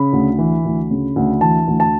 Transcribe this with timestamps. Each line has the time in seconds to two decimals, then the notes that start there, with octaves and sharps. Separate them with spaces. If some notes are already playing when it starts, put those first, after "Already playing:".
Already playing: C#3 B5
0.13 D2
0.39 E3
0.65 D2
0.91 C#3
1.16 D2
1.41 E3 A5
1.68 D2
1.80 A5